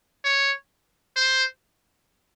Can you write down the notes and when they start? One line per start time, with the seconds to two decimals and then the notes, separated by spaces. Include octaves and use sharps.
0.24 C#5
1.16 C5